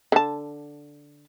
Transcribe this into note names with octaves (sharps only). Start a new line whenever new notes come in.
D3 A5